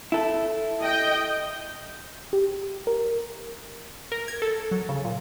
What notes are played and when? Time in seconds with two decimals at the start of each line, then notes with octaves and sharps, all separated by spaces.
0.12 E4 A4
0.84 D#5 G5
2.33 G4
2.87 A#4
4.12 A#4
4.28 G#6
4.42 A4
4.71 F#3
4.89 C#3
5.05 A#2